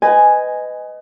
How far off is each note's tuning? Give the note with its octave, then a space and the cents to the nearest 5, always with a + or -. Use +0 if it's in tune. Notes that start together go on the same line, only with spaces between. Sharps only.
B4 +30 D#5 +0 G#5 +0